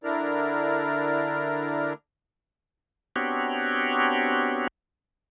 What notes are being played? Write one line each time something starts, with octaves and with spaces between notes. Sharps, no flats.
D3 D4 E4 A#4 D5 F6
B3 C4 D4 F#4 G4 C#5